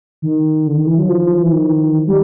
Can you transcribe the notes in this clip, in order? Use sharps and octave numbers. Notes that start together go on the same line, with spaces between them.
D#3
D3
D#3
E3
F#3
F3
E3
D#3
G3